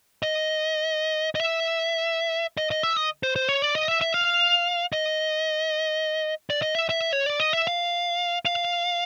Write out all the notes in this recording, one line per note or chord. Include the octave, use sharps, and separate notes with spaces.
D#5
D#5
E5
D#5
D#5
E5
D#5
C5
C5
C#5
D5
D#5
E5
E5
F5
D#5
D5
D#5
E5
E5
C#5
D5
D#5
E5
F5
F5